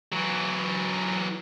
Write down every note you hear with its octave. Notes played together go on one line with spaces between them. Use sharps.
E3 F#3